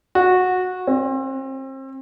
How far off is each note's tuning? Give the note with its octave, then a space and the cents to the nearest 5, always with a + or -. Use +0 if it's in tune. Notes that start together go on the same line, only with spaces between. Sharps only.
F#4 -15
C4 +35